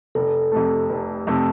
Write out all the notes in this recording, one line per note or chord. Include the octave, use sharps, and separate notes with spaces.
F1 A4
F2 C3 A3
F1
F2 C3 A3